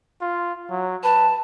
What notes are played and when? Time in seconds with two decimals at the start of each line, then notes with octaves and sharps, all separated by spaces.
0.21 F4
0.70 F#3
1.03 B4 A5